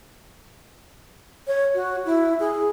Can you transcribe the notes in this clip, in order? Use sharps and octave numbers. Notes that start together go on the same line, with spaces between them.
C#5
F#4
E4
G#4